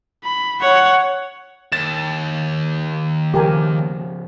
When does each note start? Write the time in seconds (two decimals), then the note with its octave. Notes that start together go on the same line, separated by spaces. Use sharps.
0.24 B5
0.61 C#5 F#5
1.72 D#2 A6 E7
3.34 C#3 F3 G4 A#4 G#5